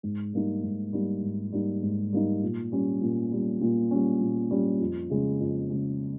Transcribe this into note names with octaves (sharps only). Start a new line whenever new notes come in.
G#2
G3 A#3 D#4
G#2
G3 A#3 D#4
G#2
G3 A#3 D#4
G#2
G3 A#3 D#4
A#2
G3 C#4
A#2
G3 C#4
A#2
G3 C#4
A#2
G3 C#4
F2
C#3 G#3 C#4
F2
C#3 G#3 C#4